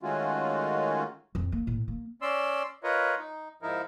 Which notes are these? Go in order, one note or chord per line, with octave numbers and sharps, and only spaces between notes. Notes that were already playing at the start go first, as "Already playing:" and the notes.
D#3 G#3 A3 C#4 F4 F#4
F2
A#3
A2
A#3
C#4 D5 C6 E6
F4 A#4 B4 C#5 D#5
D#4
G#2 F3 D#4 E4 A#4